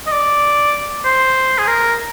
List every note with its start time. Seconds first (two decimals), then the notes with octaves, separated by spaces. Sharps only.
0.07 D#5
0.12 D5
1.05 C5
1.58 G#4
1.67 A#4